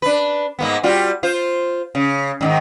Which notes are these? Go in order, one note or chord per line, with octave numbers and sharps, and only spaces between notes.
D4 B4
G#2 A#3 B3
G3 F4 F#4
F4 C5
C#3
G#2 D3 D#3